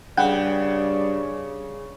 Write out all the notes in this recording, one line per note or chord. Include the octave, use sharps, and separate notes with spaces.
G2 C#3 D5 F#5 G5